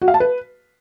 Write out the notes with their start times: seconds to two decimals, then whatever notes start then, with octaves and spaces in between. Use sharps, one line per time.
0.02 F#4
0.08 F5
0.14 A5
0.20 B4